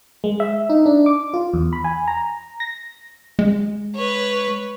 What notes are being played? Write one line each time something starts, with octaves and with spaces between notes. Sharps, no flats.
G#3
E5
D#4
D4
D6
F4
E2
B5
G#5
A#5
A#6
G#3
B4 C#5